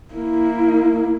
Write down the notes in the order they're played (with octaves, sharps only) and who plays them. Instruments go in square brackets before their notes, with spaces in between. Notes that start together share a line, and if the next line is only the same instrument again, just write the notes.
[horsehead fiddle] A#3 E4